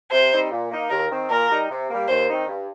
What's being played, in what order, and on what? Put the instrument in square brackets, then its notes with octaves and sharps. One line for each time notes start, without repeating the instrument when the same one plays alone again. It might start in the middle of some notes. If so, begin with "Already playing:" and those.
[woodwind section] C3 [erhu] C5
[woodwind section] G3 C4 D#4
A#2
A#3 D#4
[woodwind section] D#2 [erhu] A#4
[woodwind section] D#3 C4
[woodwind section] A#2 [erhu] A#4
[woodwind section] G3 D#4
C3
G3 A#3
[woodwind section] D#2 [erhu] C5
[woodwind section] D#3 C4 D#4
G2